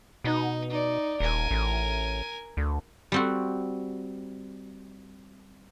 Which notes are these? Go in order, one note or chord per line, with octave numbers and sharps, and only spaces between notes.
B2 D#4
D#4 D5
D#1 A#4 G#5
A1
D2
G3 C4 F#4